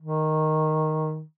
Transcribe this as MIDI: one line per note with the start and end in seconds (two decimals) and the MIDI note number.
0.01 1.23 51